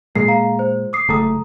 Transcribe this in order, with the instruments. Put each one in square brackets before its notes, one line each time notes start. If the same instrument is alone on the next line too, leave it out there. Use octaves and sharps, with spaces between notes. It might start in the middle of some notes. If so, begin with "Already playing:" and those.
[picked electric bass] A#2 G#3 A#3 [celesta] C7
[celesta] F5 A#5
C5
D6 D#6 C7
[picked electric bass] F#1 A3 [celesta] A#5 D#6